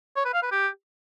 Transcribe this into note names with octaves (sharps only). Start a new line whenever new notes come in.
C#5
B4
F5
B4
G4